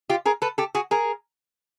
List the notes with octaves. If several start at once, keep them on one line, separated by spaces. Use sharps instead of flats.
F4 G4
G#4 A#4
A4 B4
G4 A4
F#4 G#4
G#4 A#4